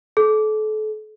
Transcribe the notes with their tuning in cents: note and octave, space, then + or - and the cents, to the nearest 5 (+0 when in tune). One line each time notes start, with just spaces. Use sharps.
A4 -35